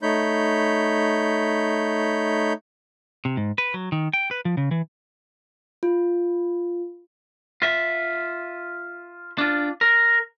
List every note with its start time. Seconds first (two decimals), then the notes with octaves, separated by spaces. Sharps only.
0.02 A3 D#4 C#5 B5 G6
3.25 C3
3.37 G#2
3.58 B4
3.74 F#3
3.92 D#3
4.13 G5
4.31 B4
4.45 F3
4.57 C#3
4.71 E3
5.83 F4
7.62 F4 E5
9.38 D4 F4
9.81 A#4